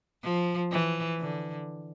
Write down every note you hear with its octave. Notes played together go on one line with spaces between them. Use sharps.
F3
E3
D3